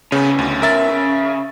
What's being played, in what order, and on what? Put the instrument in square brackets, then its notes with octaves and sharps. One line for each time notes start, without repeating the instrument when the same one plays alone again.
[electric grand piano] C#3 [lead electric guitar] B3 C#4
[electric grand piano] D2
A#4 E5 A6
[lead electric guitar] C#3